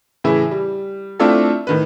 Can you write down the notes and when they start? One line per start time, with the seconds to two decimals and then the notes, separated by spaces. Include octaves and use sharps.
0.24 A2 C#3 E3 E4
0.51 G3
1.19 A3 C4 D4 E4 F4 A4
1.67 A2 D#3 B4